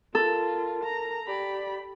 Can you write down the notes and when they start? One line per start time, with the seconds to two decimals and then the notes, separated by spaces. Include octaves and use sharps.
0.15 F4 A4 A#4
0.84 A#5
1.27 G4 D5 B5